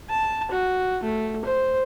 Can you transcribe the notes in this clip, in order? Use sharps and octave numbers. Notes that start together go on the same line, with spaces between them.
A5
F#4
A3
C5